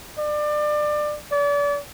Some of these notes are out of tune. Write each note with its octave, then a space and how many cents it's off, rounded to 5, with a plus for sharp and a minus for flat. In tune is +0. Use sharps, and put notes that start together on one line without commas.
D5 +25
D5 -35